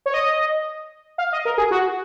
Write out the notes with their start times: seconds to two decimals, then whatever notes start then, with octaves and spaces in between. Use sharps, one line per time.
0.06 C#5
0.14 D#5
1.18 F5
1.32 D#5
1.45 A#4
1.58 G#4
1.71 F#4